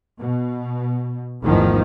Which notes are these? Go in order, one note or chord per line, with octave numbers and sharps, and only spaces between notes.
B2
A1 E2 G#2 D#3 F3